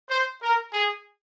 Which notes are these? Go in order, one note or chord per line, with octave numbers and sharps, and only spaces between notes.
C5
A#4
G#4